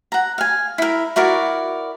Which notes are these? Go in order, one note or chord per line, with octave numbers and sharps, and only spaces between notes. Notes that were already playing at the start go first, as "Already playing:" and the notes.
F#5 A#5
F5 G#5
E4 A#4
E4 F#4 A#4 D5